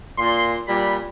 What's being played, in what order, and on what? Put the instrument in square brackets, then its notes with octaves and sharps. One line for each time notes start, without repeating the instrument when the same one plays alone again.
[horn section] A#2 C6
A#2 G3 B5